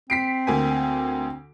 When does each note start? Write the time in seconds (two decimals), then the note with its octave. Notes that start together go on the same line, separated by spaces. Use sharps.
0.10 C4 B6 C7 D7
0.47 D2 A#3 G#5